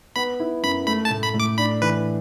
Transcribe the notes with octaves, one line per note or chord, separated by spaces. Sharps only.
B3 B5
E4
F#2 B5
A3 B5
A5
A2
B5
A2
D6
D4 B5
E3 B4